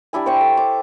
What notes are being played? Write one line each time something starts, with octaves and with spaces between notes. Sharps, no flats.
G3 D4 E4 G#5
C5 E5 G5 C#6
A4
D6